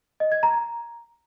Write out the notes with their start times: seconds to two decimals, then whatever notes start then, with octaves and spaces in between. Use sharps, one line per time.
0.20 D#5
0.32 G#6
0.43 A#5